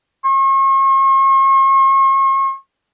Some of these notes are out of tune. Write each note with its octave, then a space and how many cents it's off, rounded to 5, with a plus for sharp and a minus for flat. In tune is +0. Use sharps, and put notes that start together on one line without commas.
C#6 -45